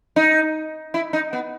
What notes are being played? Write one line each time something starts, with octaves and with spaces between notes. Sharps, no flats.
D#4
E4
D#4
B3